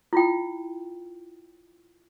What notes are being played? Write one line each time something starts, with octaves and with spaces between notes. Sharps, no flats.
E4 F4 G5